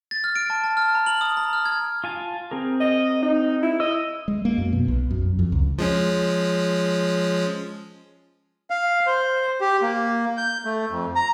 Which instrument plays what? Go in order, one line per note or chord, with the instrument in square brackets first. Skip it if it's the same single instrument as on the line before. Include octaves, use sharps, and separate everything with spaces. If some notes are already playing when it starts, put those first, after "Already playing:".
[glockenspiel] A6
F6
D7
A5
A5
F6
A#5
F#7
D#6
A#5
F6
G#6
[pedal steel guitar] F4 G#5 A5
C4 G#4 A#4
[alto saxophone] D#5
D#4
E4
[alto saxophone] D#5 [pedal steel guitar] E6
[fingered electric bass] G#3
A#3
F#2
B2
B1
F#2
F2
C#2
[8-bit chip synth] F3 G#3 C#4
[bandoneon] F5
C5
G4
A#3
G6
A3
F2
A#5